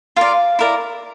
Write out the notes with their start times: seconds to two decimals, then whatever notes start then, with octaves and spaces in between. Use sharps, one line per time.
0.16 F4 A#4 D5 F5
0.59 E4 A#4 D5